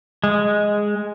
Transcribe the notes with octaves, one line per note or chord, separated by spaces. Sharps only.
G#3